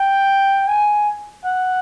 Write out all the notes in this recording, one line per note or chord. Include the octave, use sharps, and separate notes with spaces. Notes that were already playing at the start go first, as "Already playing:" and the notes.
Already playing: G5
G#5
F#5